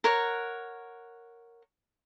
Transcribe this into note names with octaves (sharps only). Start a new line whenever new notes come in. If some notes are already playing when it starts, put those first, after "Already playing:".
A#4 C#5 F#5